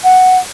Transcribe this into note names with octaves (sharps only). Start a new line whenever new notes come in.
F#5